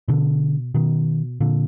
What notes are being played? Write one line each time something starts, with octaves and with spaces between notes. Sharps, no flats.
B2 D3
B2 D#3
A#2 D3